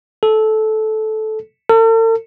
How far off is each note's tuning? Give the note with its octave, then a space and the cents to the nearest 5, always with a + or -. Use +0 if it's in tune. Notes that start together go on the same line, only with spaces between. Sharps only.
A4 -15
A4 +45